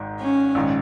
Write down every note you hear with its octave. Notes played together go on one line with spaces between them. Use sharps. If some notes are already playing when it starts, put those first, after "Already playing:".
Already playing: G#1 G#2 D#3
C#4
A#1 G#2 D#3